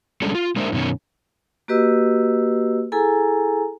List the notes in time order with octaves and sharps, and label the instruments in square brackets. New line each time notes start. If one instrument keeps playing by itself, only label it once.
[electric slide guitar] G3 G#3 C#4 D4 A4
F4
G#3 A#3 D4 A#4 C5 E5
F#2 B2 D#3 C#4
[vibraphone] A#3 F#4 G4 B4 D#5 E6
E4 G#4 A4 G#5 A#5